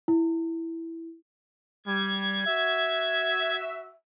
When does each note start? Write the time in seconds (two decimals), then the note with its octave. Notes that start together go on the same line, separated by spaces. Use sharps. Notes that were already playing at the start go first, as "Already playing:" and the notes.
0.08 E4
1.87 G3 G#6
2.46 F#4 E5